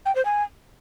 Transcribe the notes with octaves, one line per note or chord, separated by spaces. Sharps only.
G5
C5
G#5